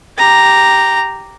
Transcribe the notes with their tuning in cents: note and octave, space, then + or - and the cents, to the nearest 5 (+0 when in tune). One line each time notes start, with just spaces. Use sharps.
G4 -5 A#5 +0